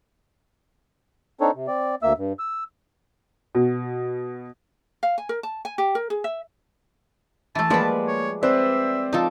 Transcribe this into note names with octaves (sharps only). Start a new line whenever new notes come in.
C4 D4 D#4 A4 C#5
C3
C4 D5
D2 A#3 E5 E6
G2
E6
B2
F5
G#5
A#4
A5
G#5
G4
A#4
G#4
E5
E3 A3 A5
F3 G3 G#3 A#3 B4 D5
C#5
C4 B4 C5 D5 E5
F3 D#4 A4 D6